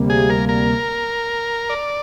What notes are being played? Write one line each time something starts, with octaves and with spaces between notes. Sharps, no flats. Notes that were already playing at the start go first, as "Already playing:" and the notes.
Already playing: D2 C3 G3 A#3
G#4
A#4
A#4
D5